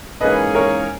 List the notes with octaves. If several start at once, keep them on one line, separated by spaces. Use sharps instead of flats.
G#2 E3 A#3 C#4 G#4 B4 D#5
A#4 C#5